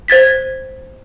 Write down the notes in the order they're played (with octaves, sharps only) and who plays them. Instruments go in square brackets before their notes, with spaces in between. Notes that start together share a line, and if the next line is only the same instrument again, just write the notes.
[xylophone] C5 G#6 A6 B6